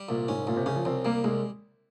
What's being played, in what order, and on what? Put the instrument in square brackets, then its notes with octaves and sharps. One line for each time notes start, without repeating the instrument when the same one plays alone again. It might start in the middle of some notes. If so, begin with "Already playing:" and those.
Already playing: [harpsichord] G3
[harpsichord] C2 [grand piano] A#2
[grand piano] G#2 [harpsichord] C#4
[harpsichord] C2 [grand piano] A#2
[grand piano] C3
[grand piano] C#3 [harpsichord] C#4
[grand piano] F3
[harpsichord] C2 [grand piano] C4
[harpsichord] G3 [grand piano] A#3
[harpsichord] C2 [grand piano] G#3